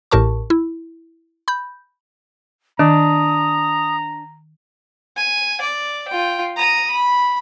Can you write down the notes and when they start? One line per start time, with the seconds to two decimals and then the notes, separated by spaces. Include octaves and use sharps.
0.11 A1 A2 G4 A#4 A5 C#6
0.50 E4
1.48 B5 G6
2.79 D#3 D4 A#5 D#6
5.17 G#5
5.61 D5
6.08 F4 G5
6.57 A#5 D#6
6.91 B5